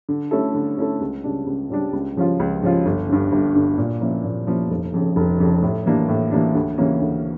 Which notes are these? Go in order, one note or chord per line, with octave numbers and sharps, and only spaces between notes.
D3
A3 C#4 E4 A4
D3
A3 C#4 E4 A4
C#2
C#3 G3 D4
C#2
C#3 G3 D4
C#2
C#3 F3 C#4 F4
C#2
C#3 F3 C#4 F4
G1
G2 D3
G1
G2 D3
A#2
F3 A#3 C#4 E4
A#2
F3 A#3 C#4 E4
F1
F2 C#3
F1
F2 C#3
A2
E3 A#3 D4
A2
E3 A#3 D4
D2
C#3 E3 A#3 C#4
D2